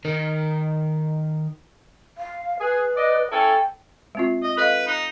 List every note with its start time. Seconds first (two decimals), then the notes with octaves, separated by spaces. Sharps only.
0.05 D#3 A#4
2.17 F5
2.60 G#4 B4
2.96 D5 D#5
3.31 C#4 E4 A4 G5
4.15 G#3 C4 F4
4.43 D#5
4.57 A4 B4 D#5 F5
4.87 D#4